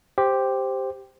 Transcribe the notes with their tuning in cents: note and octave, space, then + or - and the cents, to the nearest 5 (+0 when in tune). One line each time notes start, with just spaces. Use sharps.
G4 +0 C5 +0